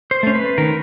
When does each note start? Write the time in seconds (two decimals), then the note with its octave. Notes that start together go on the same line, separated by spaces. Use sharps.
0.11 C5
0.23 A3 C#4
0.35 B4
0.58 D#3 A#4